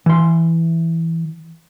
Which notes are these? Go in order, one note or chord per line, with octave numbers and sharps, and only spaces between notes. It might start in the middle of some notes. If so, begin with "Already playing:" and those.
E3 C6